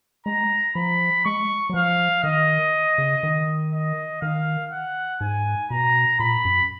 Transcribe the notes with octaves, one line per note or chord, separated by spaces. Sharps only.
G#3 A#5
F3 B5
G#3 C#6
F#3
F3 F5
D#3 D#5
C#3
D#3
D#5
D#3 F5
F#5
G#2 G#5
B2 A#5
A#2 B5
F#2